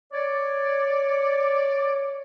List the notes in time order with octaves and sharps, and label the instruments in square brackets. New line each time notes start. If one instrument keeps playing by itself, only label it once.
[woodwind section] C#5 D5